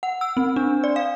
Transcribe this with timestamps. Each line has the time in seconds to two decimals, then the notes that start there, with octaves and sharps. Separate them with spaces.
0.03 F#5
0.21 E6
0.37 C4
0.56 D4
0.84 D5
0.96 F5